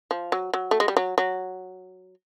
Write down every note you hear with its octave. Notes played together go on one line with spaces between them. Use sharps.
F3
F#3
F#3
A3
G#3
G3
F#3
F#3